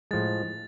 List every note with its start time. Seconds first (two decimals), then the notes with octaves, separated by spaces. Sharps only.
0.11 A2 F3 G#3 A6